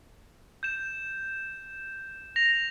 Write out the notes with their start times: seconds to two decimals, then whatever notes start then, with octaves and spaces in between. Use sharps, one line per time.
0.63 G6 E7
2.36 A#6 F7